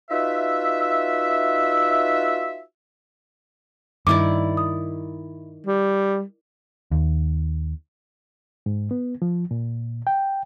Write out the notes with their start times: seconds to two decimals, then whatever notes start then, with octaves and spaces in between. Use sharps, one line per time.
0.11 D#4 F4 F#4 B4 E5
4.07 G2 D#3 E4 D5 D6
4.57 D#6
5.66 G3
6.91 D#2
8.66 G#2
8.91 B3
9.22 F3
9.51 A#2
10.07 G5